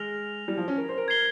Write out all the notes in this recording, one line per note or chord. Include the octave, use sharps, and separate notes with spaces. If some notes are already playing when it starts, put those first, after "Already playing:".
Already playing: G#3 F6 A#6 F7
G3
F3
C#4
A#4
C5
A#4
G#6 C7 G7